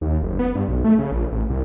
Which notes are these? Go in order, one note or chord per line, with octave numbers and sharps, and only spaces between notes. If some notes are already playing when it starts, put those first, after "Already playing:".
D#2
F#1
B3
G2
B1
A3
C#3
A#1
A1
C2